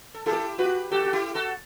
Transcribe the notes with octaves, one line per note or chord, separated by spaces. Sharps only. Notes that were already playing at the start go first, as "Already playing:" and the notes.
A4
E4 G4 A4
F#4 G4 B4
F#4 G4 A4
F#4
E4 G4
F#4 A4